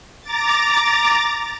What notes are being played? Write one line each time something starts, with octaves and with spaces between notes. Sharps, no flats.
A#5 D6 A6